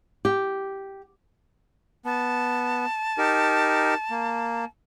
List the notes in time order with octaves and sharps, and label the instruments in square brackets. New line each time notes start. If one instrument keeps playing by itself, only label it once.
[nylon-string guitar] G4
[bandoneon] B3 [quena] A5
[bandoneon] D#4 G4 A#4
A#3